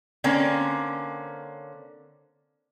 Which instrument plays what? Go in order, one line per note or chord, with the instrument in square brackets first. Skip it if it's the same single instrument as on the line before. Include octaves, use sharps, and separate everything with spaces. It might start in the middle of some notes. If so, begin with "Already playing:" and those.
[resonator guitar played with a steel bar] D3 A#3 C4 C#4